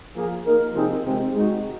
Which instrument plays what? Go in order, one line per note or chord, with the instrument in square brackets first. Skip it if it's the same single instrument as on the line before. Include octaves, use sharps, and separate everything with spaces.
[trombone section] F3 A#3 F4 G#4
A#3 D#4 A#4
C3 F3 C4 D#4 G#4
C3 D#3 G#3 C4
G#3 D#4 F#4